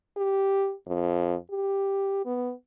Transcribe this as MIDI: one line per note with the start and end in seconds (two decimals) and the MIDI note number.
0.17 0.73 67
0.87 1.35 41
1.51 2.22 67
2.26 2.52 59